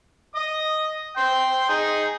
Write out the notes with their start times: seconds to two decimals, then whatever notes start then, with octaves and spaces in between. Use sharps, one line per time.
0.35 D#5 D#6
1.17 G5 C6
1.69 D#4 G#4